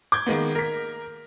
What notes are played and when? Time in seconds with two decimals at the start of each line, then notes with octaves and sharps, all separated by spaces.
0.12 D6 G6 G#6
0.26 D#3 G#3 A#3 B3
0.55 A#4 B6